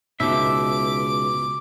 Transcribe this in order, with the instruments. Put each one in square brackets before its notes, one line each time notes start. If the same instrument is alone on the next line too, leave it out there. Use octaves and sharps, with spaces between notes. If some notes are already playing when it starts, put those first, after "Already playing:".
[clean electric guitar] C#2 E5 [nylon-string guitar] B2 D#4 [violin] D6